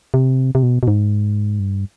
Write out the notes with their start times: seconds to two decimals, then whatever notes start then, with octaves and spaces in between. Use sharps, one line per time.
0.14 C3
0.55 C3
0.63 B2
0.83 B2
0.88 G#2
1.60 G2